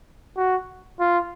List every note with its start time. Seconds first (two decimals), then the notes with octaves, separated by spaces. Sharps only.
0.37 F#4
1.00 F4